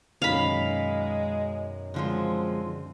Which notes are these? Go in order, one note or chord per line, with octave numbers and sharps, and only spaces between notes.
B1 F#2 D#3 G#3 F5 B5
D3 F3 G#3 C4